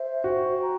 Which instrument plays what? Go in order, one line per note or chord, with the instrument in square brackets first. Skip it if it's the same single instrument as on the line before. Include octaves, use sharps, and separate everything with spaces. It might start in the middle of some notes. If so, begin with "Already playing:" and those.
Already playing: [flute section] C5 E5
[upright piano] F#4 [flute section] G5
[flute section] A#5